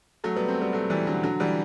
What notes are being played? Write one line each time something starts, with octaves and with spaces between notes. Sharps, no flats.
F#3 A3
G3 B3
A3 C4
G3 B3
F#3 A3
E3 G3
D3 F#3
D3 F#3
E3 G3